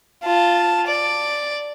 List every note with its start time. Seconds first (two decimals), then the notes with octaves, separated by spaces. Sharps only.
0.23 F4 A5
0.87 D5